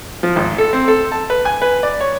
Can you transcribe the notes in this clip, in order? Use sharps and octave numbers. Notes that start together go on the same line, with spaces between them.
F3
G#1
A4
C4
A4
A5
B4
G#5
B4
D5
C#5